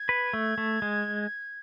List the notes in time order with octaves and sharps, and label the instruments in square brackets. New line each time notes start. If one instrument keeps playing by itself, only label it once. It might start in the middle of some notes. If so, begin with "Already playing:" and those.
Already playing: [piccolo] G#6
[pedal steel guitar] B4
A3
A3
G#3